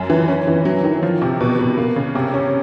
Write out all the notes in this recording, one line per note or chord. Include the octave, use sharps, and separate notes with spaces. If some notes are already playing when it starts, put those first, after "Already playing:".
Already playing: F#2
E3
C#4
E3
F#3
D#3
F3
C3
B2
B2
A#3
C#3
C3
C#4